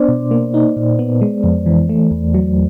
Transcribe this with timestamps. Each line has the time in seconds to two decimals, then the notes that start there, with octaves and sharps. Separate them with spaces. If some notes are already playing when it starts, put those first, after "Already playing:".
Already playing: B3 D4 C5 D5
0.08 B2
0.31 A#3
0.54 D#4
0.77 A#2
0.99 B3
1.21 G#3
1.44 F2
1.66 E3
1.89 A3
2.11 E2
2.34 F#3